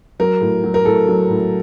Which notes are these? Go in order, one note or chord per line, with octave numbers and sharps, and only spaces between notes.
F#3 A#4
A2
F#3
A#4
A2 A4
F#3
A2